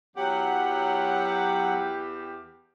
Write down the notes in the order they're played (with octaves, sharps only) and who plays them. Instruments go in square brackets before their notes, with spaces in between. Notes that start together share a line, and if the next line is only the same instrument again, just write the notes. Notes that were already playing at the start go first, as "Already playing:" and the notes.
[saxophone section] E2 G4 [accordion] F#3 F#5